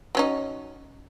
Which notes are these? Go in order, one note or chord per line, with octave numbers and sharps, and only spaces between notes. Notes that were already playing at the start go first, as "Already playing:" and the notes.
F#3 C#4 D#4